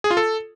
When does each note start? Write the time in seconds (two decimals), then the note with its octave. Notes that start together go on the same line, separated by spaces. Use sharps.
0.04 G#4
0.11 F4
0.17 A4